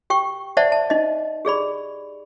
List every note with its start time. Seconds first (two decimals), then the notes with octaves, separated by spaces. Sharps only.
0.10 G4 G5 C#6
0.57 C5 D5 E5 F#5 A5
0.72 A5
0.90 D#4 D#5
1.45 G4 G#4 D5 B5